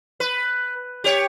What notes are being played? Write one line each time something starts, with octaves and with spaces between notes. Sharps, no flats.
B4
G4 C#5